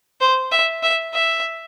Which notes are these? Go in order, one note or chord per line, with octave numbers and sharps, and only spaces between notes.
C5
E5
E5
E5